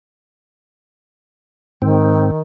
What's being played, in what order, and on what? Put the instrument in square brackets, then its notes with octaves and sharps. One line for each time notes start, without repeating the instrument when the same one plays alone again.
[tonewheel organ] G#2 C4 [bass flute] D#3